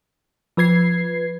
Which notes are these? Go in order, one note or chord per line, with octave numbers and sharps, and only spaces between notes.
F3 B4 G#6 C7